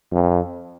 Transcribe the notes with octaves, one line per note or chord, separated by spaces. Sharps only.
F2